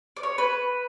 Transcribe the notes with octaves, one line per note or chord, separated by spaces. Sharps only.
D5
C#5
B4